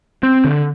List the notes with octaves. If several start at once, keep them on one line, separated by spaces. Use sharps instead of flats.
C4
D3